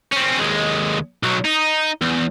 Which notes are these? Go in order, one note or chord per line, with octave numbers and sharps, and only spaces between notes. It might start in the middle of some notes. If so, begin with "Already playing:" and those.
C4 C#4
D#2 G#3
B1 F#3
D#4
E2